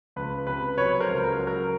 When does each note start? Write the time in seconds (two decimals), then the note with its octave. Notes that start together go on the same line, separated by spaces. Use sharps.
0.16 C#2 B4
0.47 C3 B4
0.77 F#3 B4 C#5
1.00 A#4 C5
1.09 C#2
1.24 A#4
1.39 F#3
1.47 A#4